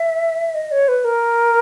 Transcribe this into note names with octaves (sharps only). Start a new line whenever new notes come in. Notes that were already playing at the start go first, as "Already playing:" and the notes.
Already playing: E5
D#5
C#5
B4
A#4